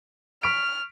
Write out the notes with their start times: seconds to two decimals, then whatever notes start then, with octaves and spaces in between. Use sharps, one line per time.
0.43 C#6 F6 B6 D7